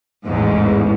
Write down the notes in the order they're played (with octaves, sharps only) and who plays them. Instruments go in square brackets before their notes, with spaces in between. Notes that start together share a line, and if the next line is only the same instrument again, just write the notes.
[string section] A1 E2 G#2